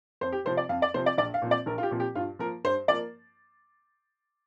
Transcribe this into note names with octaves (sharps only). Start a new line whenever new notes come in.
F2 C5
G4
C3 F3 C4 C5
D5
F2 F5
D5
C3 F3 C4 C5
D5
A#1 D5
F5
A#2 F3 C4
D5
A#1 A#4
F4
G4
A#2 F3 C4
G4
G2 F4
F3 A#3 A#4
G2 C5
F3 A#3 D5